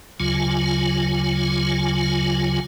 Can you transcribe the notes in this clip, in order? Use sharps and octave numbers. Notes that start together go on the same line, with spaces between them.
D2 C#3 F#3 F4 G#5